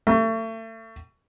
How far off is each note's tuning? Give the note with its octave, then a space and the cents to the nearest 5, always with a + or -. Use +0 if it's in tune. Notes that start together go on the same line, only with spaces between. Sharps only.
A3 +35